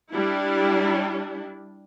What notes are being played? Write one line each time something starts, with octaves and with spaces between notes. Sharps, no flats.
G3 D4 E4